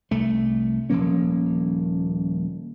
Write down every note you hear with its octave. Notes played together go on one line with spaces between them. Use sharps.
C2 A3
D#1 F3 A#3 C#4